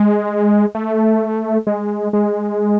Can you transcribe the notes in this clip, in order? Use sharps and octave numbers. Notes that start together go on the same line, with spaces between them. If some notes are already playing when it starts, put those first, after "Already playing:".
Already playing: G#3
A3
G#3
G#3